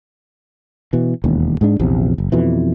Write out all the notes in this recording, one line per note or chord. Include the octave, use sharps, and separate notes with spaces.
B2 E3
E1 D#2
G#2 G#3 D4
A#1 E2 C3
F#1
F2 B2 E3